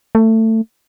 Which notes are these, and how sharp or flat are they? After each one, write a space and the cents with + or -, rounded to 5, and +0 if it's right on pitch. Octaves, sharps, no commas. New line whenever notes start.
A3 +20